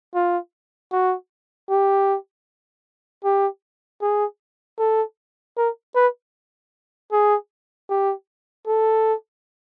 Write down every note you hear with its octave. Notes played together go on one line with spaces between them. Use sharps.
F4
F#4
G4
G4
G#4
A4
A#4
B4
G#4
G4
A4